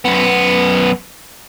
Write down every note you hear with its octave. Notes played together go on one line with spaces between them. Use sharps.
F#2 B3